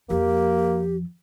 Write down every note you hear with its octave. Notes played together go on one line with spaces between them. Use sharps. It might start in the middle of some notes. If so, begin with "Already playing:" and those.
F2 F3 A#3 G4